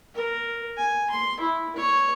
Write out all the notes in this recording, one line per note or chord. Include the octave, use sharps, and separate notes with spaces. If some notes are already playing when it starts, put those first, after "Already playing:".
A#4
G#5
C6
E4
C#5